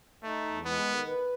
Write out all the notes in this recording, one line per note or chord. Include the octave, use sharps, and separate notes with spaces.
A3 D#4
E2
G#3 B3
D#3
B4